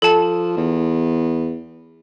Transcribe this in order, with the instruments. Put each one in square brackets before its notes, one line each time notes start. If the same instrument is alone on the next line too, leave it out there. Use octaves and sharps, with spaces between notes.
[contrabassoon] F3 [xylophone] A4 A5
[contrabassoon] E2